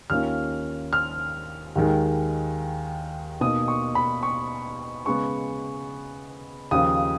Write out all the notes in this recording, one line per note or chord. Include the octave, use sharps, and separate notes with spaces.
D#2 D#3 A#3 C#4 F4 F6
F6
D#2 D#3 G#3
B2 A#3 D#4 D#6
C#6
B5
C#6
C#3 G#3 B3 C#6
D#2 C#3 F3 D#6